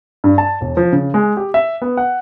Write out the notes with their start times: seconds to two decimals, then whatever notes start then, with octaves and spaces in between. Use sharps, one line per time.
0.24 G2
0.38 A5
0.61 E1
0.77 F3
0.92 C#3
1.14 G#3
1.37 G4
1.54 E5
1.82 B3
1.97 F#5